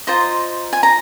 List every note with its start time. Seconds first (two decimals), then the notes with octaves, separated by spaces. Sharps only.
0.07 F4 C5 D#5 A#5
0.73 G#5
0.83 A#5